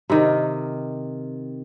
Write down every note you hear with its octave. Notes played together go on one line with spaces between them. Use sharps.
C3 D#3